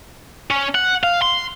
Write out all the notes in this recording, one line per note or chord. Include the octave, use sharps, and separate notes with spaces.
C#4
F#5
F5
C6